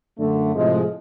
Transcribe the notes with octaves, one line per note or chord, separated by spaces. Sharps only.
F#2 D3 A3
A2 C3 F3 G#3